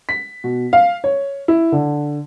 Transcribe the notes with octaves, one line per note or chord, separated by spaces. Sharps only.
B6
B2
F5
C#5
E4
D3